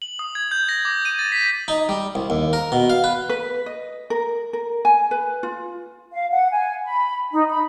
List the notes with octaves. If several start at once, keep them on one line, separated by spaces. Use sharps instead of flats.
F#7
D#6
G#6
G6
A#6
D6
D#7
A6
B6
D#4
G3
C2
D#2
A#4
B2
F5
B4
B4
D#5
A#4
A#4
G#5
B4
F4
F5
F#5
G#5
B5
D#4
B5